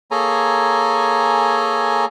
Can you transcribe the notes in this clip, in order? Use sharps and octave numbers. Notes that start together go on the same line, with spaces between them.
A#3 G#4 A4 C#5 G#5 A#5